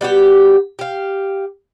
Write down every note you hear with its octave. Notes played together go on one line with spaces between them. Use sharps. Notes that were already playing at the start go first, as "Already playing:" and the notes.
G3 B3 F#4 G4
G4 F5